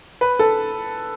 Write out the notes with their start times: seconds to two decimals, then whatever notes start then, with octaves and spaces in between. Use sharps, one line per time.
0.21 B4
0.39 A4